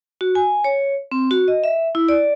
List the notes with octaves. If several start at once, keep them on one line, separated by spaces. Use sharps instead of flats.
F#4
G#5
C#5
C4
F#4
D#5
E5
E4
D5